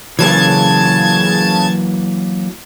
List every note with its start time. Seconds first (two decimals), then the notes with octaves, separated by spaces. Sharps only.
0.19 C#3 E3 F#3 A#3 A5 G#6